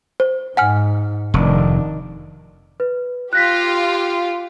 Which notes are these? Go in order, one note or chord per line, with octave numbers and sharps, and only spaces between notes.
C5
G#2 F#5 G#5 F6
F1 D#3 D4
B4
F4 G4 F#6 A#6 B6